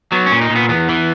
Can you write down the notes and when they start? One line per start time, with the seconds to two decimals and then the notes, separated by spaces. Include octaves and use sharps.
0.12 F#3 B3
0.26 C#4
0.32 A#2
0.41 D#4
0.50 A#2
0.56 B3
0.69 E2 B3
0.89 E3